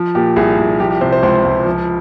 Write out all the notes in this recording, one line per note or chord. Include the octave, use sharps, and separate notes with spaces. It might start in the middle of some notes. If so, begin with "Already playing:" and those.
Already playing: F3
A#2 G4
C2 G#4
C2
F3 G4
G4
C3 C5
C5
C#2 C5
C#2
F3